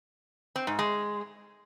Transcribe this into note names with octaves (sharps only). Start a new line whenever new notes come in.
C4
G#2
G#3